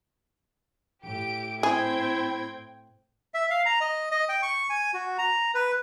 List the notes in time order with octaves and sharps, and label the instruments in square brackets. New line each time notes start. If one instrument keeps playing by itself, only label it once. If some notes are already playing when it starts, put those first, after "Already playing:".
[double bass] A2 [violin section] G4 D7
[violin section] C4 G5 G#6 [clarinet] E4 [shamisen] G#4
[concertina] E5
F5
A#5
D#5
D#5
G5
C#6
G#5
F#4
A#5
B4